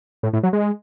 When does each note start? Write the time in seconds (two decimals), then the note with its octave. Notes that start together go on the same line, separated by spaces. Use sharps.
0.23 A2
0.33 A2
0.43 F#3
0.53 G#3